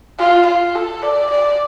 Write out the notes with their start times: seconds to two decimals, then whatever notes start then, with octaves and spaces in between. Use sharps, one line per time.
0.19 F4
0.47 F4
0.75 A4
1.03 D5
1.31 D5